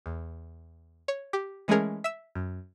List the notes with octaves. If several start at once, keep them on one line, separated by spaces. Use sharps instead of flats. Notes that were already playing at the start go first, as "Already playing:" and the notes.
E2
C#5
G4
E3 G#3 A3 C#4 G#4 A#4
E5 E6
F#2